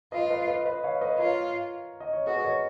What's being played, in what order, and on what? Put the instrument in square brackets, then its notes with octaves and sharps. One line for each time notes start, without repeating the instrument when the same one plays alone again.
[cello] F4 [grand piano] B4 D#5
[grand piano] B4 D#5
B4 D#5
B4 D#5
C#5 F5
B4 D#5
[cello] F4 [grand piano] A#4 C#5
[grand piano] D#5
C#5
[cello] F#4 [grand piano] G#4 B4
[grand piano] D#5
A#4 C#5